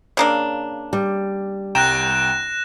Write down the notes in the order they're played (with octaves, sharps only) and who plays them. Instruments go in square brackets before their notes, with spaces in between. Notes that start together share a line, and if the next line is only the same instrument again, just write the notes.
[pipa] C#3 A#3 D4
[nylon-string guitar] G3
[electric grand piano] C2 G5 A#5 [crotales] F#6 A#6 E7